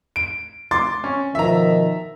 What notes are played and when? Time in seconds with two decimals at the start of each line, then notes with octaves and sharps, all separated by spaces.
0.16 D7
0.71 C6 D6 A6
1.04 C#4
1.35 B2 D#3 F3 E5 A#5